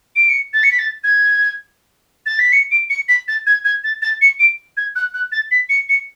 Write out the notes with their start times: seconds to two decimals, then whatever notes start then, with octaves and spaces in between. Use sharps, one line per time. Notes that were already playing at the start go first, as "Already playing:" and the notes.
0.16 D7
0.29 C#7
0.53 A6
0.63 C#7
0.71 B6
0.79 A6
1.04 G#6
2.26 A6
2.39 B6
2.52 C#7
2.71 D7
2.90 C#7
3.08 B6
3.28 A6
3.46 G#6
3.64 G#6
3.84 A6
4.02 A6
4.21 C#7
4.39 D7
4.77 G#6
4.96 F#6
5.14 F#6
5.32 A6
5.51 B6
5.69 C#7
5.89 C#7